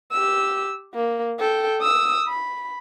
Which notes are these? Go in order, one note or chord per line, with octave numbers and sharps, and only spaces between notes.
G4 E6
A#3
A4 G5
D#6 E6
B5